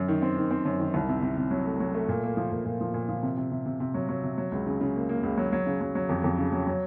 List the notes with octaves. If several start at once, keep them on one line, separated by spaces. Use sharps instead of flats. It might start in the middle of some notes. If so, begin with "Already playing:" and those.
Already playing: F#2
D#3
C4
D#3
C4
F#2
D#3
C2
C3
C3
C3
F#3
A3
F#3
A3
A#2
A#3
F3
A#2
A#2
F3
A#2
F3
C3
C3
C3
C3
C3
F#3
F#3
C3
F#3
C#2
C#3
C#3
A#3
A#3
C#2
F#3
F#3
C#3
F#3
F#3
F2
F2
C#3
F#3
F#3